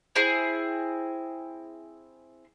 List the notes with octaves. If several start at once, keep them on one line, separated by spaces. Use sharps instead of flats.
C4 E4 G#4